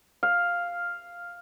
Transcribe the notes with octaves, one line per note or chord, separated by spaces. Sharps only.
F5